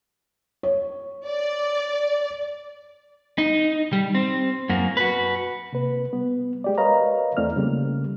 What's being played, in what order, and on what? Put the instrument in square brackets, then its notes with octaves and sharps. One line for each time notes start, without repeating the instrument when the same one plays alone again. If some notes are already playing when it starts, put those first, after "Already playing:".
[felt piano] C#5
[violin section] D5
[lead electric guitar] D#4
G3
C4
F#2 A#3
F#4 B4
[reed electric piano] C3 A#3 B4
G3 B3
G#3 G4 D5
A#4 B4 C#5 D#5 F5 A#5
E2 A3 C4 E4 D5 F6
C#3 G3 A3 A#3